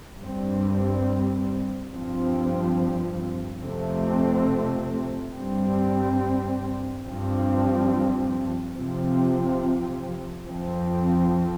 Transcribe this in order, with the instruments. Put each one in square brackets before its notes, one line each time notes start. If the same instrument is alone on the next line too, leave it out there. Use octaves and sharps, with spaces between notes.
[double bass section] G2 G3 C4
G2 F3 C4
F2 C3 A3 C4
G2 G3 C4
G2 F3 C4
C3 F3 C4
F2 F3 C4